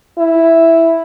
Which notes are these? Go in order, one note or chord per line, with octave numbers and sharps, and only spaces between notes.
E4